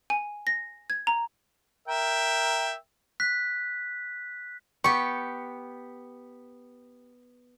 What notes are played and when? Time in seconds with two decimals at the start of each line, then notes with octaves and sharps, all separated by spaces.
0.10 G#5
0.47 A#6
0.90 G#6
1.07 A#5
1.88 A#4 E5 G5
3.20 F#6 B6
4.84 B3 G4 C#6